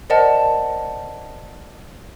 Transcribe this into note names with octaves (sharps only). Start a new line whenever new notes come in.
A#4 C5 D5 D#5 F#5 A5